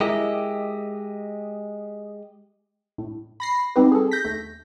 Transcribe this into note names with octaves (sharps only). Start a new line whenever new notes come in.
G#3 E4 G4 A#4 D#5
A2
B5 A#6 C7
G3 B3 C4 D#4 G4 B4
G#4 A4
G6 A#6 B6
D#2 A3